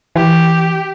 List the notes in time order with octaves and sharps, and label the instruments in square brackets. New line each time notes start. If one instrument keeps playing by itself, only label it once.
[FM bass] E3 [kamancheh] G4